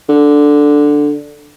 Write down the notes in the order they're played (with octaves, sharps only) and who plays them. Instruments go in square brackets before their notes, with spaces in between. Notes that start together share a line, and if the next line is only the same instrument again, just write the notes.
[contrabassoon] D3